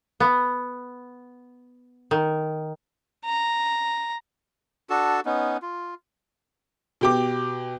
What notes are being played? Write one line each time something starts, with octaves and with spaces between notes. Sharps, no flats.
B3
D#3
A#5
D4 F#4 A4 A5
B3 C#4 D#4
F4
B2 G4 D6